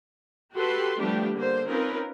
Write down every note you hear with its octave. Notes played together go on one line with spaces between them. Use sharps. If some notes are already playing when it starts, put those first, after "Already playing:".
F#4 G4 A4 B4 C6
F3 G3 A3 B3 D4 G4
D3 A#3 C5
C4 C#4 D#4 F4 A#4 B4